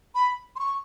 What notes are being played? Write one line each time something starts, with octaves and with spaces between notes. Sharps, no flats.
B5
C6
C#6